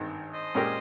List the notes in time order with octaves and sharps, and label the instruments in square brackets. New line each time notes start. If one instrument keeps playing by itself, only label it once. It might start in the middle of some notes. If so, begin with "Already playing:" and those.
Already playing: [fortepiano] G#1 G2 D#3
[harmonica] C5 D#5
[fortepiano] A#2 G#3 C#4 G4 A#4